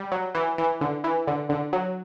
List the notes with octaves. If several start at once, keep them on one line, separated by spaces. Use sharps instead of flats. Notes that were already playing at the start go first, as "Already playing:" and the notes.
Already playing: G3
F#3
E3
E3
D3
E3
D3
D3
F#3